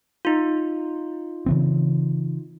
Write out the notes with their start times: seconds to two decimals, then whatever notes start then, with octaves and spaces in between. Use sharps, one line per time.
0.25 D#4 F4
1.46 C#3 E3 C4